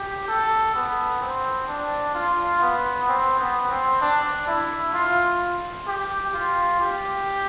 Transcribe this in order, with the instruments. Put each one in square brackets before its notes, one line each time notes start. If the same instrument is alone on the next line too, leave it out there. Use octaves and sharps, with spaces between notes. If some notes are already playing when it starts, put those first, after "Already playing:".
Already playing: [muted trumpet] G4
A4
B3
C4
D4
F4
B3
C4
B3
C4
D4
E4
F4
G4
F4
G4